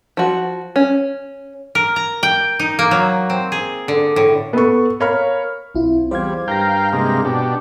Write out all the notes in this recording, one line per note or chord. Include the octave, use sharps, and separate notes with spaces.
F3 F#4
C#4
A#4
A#5
G5
D#4
A#3
F#3
C4
G#4
D3
A2
B3 A4 C#6
A#4 C#5 F5 B5 F6
B1 C4 E4 F4
E2 G3 C5 F5 G#6
G2 A#4 F5 G5 G6 A#6
C3 G#3 A#3
B2 D4 G4